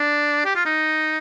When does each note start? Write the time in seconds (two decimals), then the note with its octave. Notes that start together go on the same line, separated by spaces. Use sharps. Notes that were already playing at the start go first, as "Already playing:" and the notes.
Already playing: D4
0.46 G4
0.56 F4
0.66 D#4